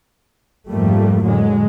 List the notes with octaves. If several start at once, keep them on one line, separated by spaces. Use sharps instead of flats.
F2 G#2 F3 G3 A3 A#3
A2 D3 F#3 G#3